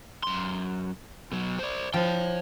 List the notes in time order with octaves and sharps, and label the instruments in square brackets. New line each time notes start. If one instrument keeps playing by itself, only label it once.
[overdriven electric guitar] F#2 C6
B2 F#3
C5 D5
[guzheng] F3 [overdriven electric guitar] C#5 G5